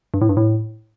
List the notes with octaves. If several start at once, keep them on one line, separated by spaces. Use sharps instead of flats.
G2
A2
G2
A2